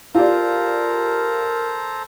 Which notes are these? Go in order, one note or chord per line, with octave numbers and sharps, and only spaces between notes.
F4 G4 A4 A#4 C5 D5 A#5